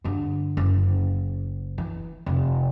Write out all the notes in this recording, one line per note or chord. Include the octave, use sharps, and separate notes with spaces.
G2 D3
F#1
E3
F1